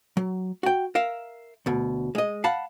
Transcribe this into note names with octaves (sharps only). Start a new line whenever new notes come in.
F#3
F#4 G5
A#4 E5 F5
D2 B2
G#3 D#5
F5 F#5 A5 B5